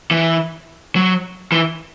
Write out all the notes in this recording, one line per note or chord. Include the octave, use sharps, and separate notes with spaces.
E3
F#3
E3